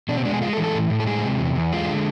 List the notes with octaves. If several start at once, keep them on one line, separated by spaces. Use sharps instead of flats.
B2 D4
C4
G#3 D4
G#4
G#3 F4
A4
E3
A4
A2
A2
A4
G#3 G#4
C3
E2
E2
G#3 F4
D3